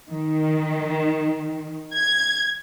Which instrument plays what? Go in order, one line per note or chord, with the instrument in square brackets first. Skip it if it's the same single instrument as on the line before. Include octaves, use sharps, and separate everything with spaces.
[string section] D#3
G#6